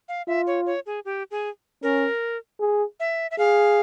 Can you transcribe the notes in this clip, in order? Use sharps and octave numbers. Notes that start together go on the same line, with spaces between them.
F5
F4 E5
C#5
C#5
G#4
G4
G#4
C#4 A#4
G#4
E5
E5
G#4 F5